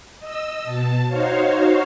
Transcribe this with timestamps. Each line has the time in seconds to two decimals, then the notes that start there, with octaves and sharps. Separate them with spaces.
0.19 D#5 E6
0.64 B2 A5
1.07 D#4 F#4 C5 C#5 F5